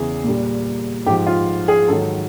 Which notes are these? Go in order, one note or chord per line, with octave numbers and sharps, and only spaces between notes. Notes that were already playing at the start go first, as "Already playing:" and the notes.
Already playing: E2 C#3 E3 G#4
A#2 G3
G#2 F3 G4
F4
G#4
G#2 D#3 F#3 A4